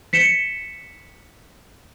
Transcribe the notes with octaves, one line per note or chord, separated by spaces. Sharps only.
B6 C#7 E7 G7